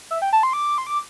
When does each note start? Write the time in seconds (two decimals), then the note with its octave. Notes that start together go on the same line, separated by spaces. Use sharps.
0.11 E5
0.22 G5
0.33 A5
0.43 C6
0.53 D6
0.78 C6
0.87 D6